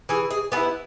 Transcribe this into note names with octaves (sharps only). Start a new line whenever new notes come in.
E3 G#4
G#4
B3 E4 G#4 B4